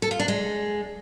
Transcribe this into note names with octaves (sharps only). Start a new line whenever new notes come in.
A4
F4
D4
G#3